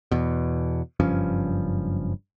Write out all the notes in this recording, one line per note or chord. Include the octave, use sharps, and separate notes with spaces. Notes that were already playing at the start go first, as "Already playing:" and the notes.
E2 B2
F#1 G2 F3 C#4